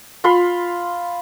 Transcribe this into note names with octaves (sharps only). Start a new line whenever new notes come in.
F4 F5 B5 C6